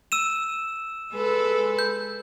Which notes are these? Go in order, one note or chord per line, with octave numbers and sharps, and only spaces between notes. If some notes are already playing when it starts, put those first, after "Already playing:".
E6 D#7 E7
G#3 A4 B4
G6